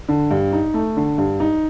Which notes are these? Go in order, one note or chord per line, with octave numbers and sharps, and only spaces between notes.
D3
G2
D#4
A3
D3
G2
D#4